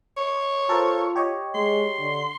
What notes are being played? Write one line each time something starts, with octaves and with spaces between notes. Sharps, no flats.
C#5
F4 A4 A#4 C5
G4 C#5 D#5
G#3 C6
D3